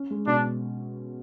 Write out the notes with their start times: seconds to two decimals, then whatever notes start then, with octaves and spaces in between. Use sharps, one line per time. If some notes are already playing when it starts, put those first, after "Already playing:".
Already playing: C#4
0.11 G#3
0.27 B2 D4